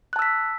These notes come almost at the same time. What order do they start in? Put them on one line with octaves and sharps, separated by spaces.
F#6 A5 E6 B6